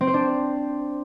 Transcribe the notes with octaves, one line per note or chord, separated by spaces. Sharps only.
C4
C5
D4